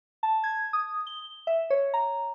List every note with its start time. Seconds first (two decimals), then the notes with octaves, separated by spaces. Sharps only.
0.23 A5
0.44 G#6
0.73 D#6
1.07 G7
1.47 E5
1.70 C#5
1.94 A#5